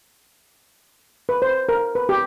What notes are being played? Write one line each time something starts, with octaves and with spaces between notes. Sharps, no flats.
B4
C5
A#4
B4
G4